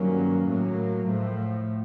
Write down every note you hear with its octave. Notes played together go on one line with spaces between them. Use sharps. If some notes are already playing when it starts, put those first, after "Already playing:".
Already playing: G2 D#3 F#3 A#3 C#4
A2 F#3 A#3
A2 F3 A3